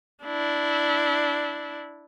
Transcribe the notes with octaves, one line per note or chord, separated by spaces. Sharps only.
D4 E4